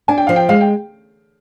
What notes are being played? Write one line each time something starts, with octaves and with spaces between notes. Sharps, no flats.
D4 G#5
G5
F3 F5
G5
G#3 F5
G5